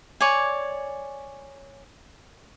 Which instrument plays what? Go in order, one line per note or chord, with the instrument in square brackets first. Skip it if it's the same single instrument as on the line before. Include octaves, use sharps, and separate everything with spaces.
[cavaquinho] C#5 D5 G#5